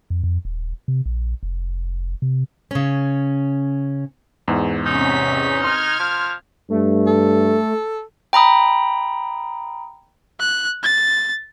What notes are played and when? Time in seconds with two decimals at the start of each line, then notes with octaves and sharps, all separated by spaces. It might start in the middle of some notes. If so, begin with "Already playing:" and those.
0.10 F2
0.24 F2
0.45 D#1
0.88 C3
1.06 A#1
1.43 F1
2.22 C3
2.71 C#3 C#4
4.48 E2 G#2
4.86 C3 C#4 D#4 B6
5.64 C6 F6 G#6
6.00 F3
6.70 G2 A3
7.07 A4
8.33 G5 A#5 B5 D#6
10.40 F#6
10.83 A6